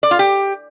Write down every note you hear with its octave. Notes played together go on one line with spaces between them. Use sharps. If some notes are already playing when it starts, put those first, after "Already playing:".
D5
F4
G4